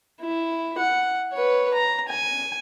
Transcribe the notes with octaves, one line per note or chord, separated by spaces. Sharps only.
E4
F#5
B4 C#5
A#5
G#5